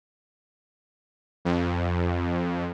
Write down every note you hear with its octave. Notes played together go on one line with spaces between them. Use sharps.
F2